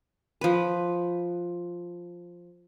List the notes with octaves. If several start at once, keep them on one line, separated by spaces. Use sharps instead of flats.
F3 B4